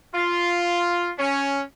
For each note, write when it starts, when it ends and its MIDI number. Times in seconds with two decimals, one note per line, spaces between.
0.14 1.11 65
1.18 1.61 61